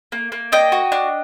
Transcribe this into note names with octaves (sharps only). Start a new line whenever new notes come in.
A#3
A#3
D4 D#5 G5
F#4
D4